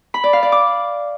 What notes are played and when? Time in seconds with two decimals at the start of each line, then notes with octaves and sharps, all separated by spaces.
0.14 B5
0.24 D5
0.33 F5
0.43 D5
0.52 D6